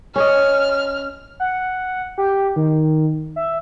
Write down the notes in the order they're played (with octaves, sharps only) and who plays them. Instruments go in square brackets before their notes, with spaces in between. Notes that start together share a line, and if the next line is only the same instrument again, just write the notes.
[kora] C#4 C#5 D#5 [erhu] F6
[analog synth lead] F#5
G4
D#3
E5